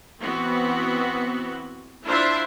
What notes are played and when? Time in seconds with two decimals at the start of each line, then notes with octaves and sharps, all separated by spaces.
0.20 E3 B3 C4 F#4
2.05 D4 E4 F4 C5 E5 C6